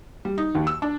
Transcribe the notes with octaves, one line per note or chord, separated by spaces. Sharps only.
G3
D#4
D#2
E6
D4